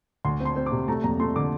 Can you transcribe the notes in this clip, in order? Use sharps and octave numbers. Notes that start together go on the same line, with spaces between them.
D2 C6
C4
C6
C4
D6
C3
A3 A#5
F2 A#5
A3 C6
D3 D6